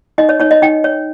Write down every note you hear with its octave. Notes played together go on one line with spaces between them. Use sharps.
D#4 D#5
C#5
D#4 C#5
D#5
D#4 G5
C#5